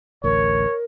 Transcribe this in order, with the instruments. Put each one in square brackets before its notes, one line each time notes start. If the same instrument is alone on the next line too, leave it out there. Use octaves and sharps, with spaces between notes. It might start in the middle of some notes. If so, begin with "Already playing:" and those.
[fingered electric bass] A1 D2 [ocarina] A#4 [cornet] C#5